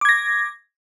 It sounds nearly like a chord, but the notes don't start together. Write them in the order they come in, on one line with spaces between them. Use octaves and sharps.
D6 G#6 A#6